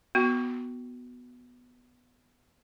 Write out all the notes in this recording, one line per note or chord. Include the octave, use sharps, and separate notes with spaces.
B3 F#4